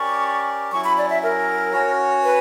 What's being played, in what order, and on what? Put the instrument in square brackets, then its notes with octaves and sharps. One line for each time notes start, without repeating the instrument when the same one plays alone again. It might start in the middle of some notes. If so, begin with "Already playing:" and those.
Already playing: [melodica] C#4 G4 A#4 D5 [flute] C#6
[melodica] F#3 C#4 E4 [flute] C#6
[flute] B5
D5
E5
A#4
[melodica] C#4 F#4 C#5
[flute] B4